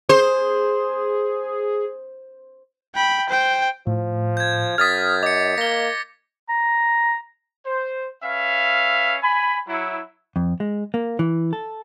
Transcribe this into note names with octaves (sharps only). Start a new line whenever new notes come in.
G#4 C5
G5 B5
C5 G5
A2 F3
G6 G#6
F#2 D#6 F6 G#6 A6 B6
D#5 D6 C#7
A#3 A#6 G7
A#5
C5
C#4 B4 E5 F5
G#5 B5
F#3 E4
F2
G#3
A#3
E3
A4